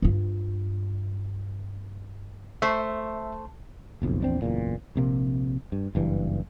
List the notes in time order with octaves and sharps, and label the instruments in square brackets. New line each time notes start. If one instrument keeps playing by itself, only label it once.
[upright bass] G2 F4
[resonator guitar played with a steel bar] A3 C5 [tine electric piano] E5
[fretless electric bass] F#1 B1 F2
A#1 E2 C4 D4
F#1 E2 A#2
A#1 C3 A#3
G2
F#1 G2 E3